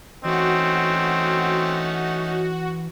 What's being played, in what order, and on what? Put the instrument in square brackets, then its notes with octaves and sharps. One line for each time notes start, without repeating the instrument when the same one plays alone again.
[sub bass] E3 [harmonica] A3 C#4 D#4 [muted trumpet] C4 [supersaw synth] F#4